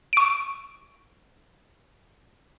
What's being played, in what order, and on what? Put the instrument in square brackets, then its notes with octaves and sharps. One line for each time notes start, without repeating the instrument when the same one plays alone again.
[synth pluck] C#6 D7